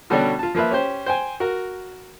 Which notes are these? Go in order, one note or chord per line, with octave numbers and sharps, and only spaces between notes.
B2 D3 G3 C#4 D4 F#4
F4 A5
F3 A#3 F4 B4 E5
C#4 G4 C5
C5 G5 G#5
F#4 A#4